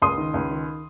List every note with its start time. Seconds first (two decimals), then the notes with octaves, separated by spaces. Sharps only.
0.02 C#2 C6 D#6
0.18 D#3
0.34 C#2
0.51 D#3